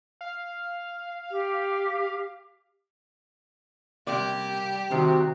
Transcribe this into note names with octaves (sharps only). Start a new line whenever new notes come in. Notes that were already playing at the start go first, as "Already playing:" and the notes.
F5
G4
C3 G3 A#3 G4 D5
C3 D#3 F#4